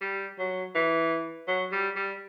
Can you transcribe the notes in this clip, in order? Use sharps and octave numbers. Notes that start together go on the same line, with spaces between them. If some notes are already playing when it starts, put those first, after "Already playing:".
G3
F#3
E3
F#3
G3
G3